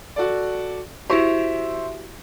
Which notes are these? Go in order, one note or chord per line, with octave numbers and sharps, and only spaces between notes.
F#4 A4 D5
E4 F#4 G4 C5 E5 C#6